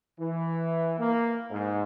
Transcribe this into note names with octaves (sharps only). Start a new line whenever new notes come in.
E3
A#3
G#2